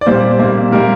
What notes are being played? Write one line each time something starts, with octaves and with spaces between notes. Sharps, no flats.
D5
A#2 G3 A#3 C5
A#2 G3 A#3
A#2 G3 A#3 A#4